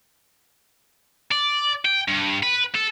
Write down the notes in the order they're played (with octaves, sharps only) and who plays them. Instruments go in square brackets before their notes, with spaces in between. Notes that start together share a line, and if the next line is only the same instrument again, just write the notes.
[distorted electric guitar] D5
G5
G2
B4
A4